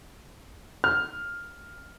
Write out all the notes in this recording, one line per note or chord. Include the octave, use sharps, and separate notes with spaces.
F6